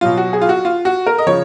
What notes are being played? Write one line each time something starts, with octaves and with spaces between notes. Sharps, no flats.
B2 F#3 F4
F#4
G#4
F4
F#4
F4
F#4
A#4
D#5
C#3 F3 C#5